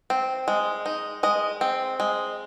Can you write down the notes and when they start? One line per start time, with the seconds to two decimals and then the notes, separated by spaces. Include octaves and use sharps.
0.10 C4
0.48 G#3
0.86 D#4
1.23 G#3 D#5
1.61 C4
2.00 G#3